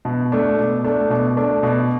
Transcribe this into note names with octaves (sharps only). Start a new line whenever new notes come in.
B2
A3 D4
B2
A3 D4
B2
A3 D4
B2